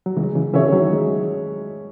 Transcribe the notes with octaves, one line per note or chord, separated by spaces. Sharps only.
F#3
C#3 E3 G#3
C#3 E3
C#3 E3 C#4 G#4 C#5 E5
D#3 F#3
G#3